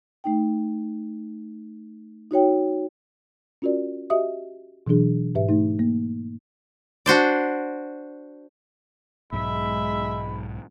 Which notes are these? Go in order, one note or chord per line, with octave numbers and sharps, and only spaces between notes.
A3 D#4 G5
D#4 F#4 C#5 G5
C#4 F4 F#4 A#4 D5
F#4 G4 D#5 E5 D#6
B2 E3 F#3 D4 G#4
G#2 G4 B4 E5
A3 D#4
A#3
D4 F#4 C5 D5
B1 G#2 F#3 G#3 E5 B5